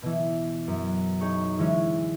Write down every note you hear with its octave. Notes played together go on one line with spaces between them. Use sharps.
B2 E3
F#2
D#4 G#4 C#5
D3 E3 G#3 C#4